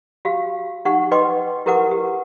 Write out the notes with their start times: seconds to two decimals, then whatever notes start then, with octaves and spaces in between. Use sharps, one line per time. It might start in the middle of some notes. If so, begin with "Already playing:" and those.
0.25 F#4 G4 F5
0.85 D#4 G4 F#5 C#6
1.11 B4 D#5 G5 C6 D6
1.66 E4 G4 A#4 B4 F#5 D6
1.91 G4